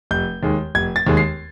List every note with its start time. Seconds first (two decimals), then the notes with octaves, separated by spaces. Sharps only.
0.11 F1 G6
0.43 D#2 D#3 G#3
0.75 F1 G#6
0.96 A6
1.07 D#2 D#3 G#3
1.17 C7